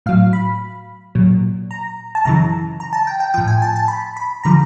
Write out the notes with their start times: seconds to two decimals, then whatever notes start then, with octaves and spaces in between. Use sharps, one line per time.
0.06 A2 F#3 F5
0.33 B5
1.15 A#2 F#3
1.71 A#5
2.15 A5
2.25 F#2 C#3 E3 A#5
2.80 A#5
2.93 A5
3.07 G5
3.20 G5
3.34 A2 F3 G5
3.47 G#5
3.62 A5
3.76 A5
3.88 B5
4.17 B5
4.43 D3 F3 A#5